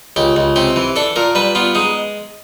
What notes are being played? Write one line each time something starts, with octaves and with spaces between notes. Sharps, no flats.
C#2 G4
C#2
C3 G4
E3
D4 A4
A#2 A#4
G3 B4
B3 F4
G#3 D#4